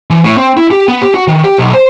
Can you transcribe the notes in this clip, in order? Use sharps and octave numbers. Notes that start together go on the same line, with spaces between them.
E3
A2
C4
E4
G4
B3
G4
F#4
D#3
G4
B1
C5